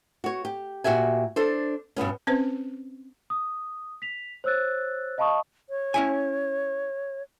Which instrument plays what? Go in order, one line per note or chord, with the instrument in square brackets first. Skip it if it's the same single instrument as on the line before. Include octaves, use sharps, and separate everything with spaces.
[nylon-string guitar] F#4 C#5
G4
A#2 F#4 G4 E5 G#5
D4 A4 C5
G2 B2 B3 C#4
[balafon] C4 C#4 B4 C5
[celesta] D#6
B6 F7
C5 C#5 E6 F#6 A6
D#5 F5 A5 B5 C#6 D#6
[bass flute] C#5
[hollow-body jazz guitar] C#4 E4 G#5